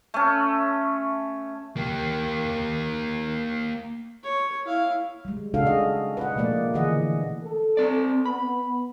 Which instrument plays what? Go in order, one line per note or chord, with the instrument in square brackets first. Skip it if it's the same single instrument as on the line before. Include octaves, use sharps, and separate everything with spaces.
[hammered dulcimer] A3 C#4
[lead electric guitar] A#3 G4
[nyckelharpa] C#5
E4 F5
[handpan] G3 G#3
C#3 G#3 D4 F#4 A4 F5
G#4 D#5
B4 D#5 F#5
B2 F3 A3 A#3 D5
D3 E3 A#3 G#4 D#5 F#5
[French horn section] A4
[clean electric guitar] C4 D5
[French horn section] B3 [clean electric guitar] B5